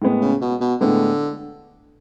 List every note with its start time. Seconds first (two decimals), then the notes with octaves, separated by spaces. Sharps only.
0.02 A2 G#3 B3
0.22 C#3
0.41 B2
0.61 B2
0.81 A2 D3 G#3 B3